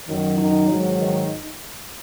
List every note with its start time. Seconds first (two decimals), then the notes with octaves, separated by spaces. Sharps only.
0.08 F#2 D#3 F#3
0.38 D#3 D#4
0.69 G#2 D#3 F#3
0.98 D#3 D#4